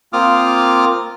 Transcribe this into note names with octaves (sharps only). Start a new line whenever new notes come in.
A#3 C4 F4 D6 D#6 F6